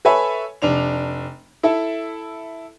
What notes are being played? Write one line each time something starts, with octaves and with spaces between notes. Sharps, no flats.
A4 B4 C#5 E5 G#5 B5
F1 D4 F7
E4 A4 E5